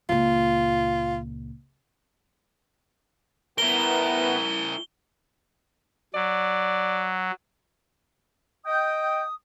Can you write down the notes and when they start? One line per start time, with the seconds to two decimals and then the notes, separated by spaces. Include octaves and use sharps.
0.09 C#2 A#2 F4
3.58 B3 E4 A#4 G7
6.14 F#3 D5
8.65 D#5 G5 D#6